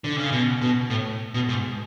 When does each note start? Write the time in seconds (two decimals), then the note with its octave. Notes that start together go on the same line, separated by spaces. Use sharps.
0.04 D3
0.18 C#3
0.32 B2
0.61 B2
0.90 A2
1.34 B2
1.49 G#2